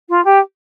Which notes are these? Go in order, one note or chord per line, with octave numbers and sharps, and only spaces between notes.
F4
G4